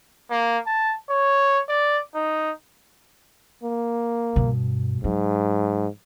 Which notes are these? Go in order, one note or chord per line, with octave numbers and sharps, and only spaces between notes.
A#3
A5
C#5
D5
D#4
A#3
G2 B2
G#2 F#3